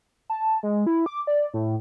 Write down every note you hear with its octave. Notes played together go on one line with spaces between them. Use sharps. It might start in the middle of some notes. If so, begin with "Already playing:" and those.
A5
G#3
E4
D6
D5
A2